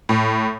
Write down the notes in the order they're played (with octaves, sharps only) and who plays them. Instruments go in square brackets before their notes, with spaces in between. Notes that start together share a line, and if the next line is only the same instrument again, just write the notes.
[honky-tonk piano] A2